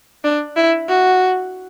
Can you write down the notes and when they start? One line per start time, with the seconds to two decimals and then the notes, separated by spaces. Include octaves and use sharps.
0.24 D4
0.57 E4
0.88 F#4